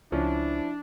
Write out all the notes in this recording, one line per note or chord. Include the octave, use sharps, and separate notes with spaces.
C#2 F3 C#4 D4 E4